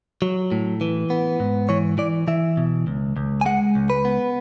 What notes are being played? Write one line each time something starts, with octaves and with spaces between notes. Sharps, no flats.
F#3
A2
E3
B3
G#2
E3 C#5
E3 D5
E3 E5
B2
C#2
C#2
G#5
G#3 F#5
C#2
B4
B3